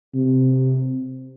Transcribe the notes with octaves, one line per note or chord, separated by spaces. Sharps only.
C3